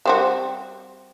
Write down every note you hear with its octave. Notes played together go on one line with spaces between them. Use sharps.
G3 C4 F#4